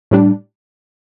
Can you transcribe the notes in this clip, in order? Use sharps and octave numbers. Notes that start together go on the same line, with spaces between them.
A2 G3 D4